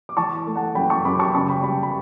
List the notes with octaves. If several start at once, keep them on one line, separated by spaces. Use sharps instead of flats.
D6
E3 A5 C#6
A3
F#5 A5
F#2 G5 B5
A5 C#6
F#2 B5 D6
A5 C#6
C#3 A5 C#6
G5 B5
G3 G5 B5
B5